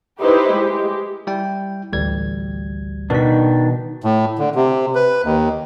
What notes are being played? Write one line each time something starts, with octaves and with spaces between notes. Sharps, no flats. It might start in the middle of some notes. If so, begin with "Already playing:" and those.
D#4 E4 G4 B4 C5
G#3 G4
G3 E4 G5
A1 D2 G3 G#6
B2 D#3 D4 B6
A2
D3
C3
B4
D#2